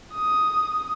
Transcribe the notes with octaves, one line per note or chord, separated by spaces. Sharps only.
D#6